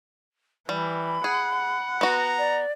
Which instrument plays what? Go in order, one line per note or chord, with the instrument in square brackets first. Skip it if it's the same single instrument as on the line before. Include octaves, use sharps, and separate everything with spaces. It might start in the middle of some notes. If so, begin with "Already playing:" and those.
[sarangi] E3 [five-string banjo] G3 [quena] B5
[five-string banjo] G#4 [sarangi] F#5
[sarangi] F#5
[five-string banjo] B3 F#4 [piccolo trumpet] A#5
[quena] D5